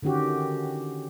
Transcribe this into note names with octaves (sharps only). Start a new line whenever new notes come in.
D3 D#3 C#4 F#4 G4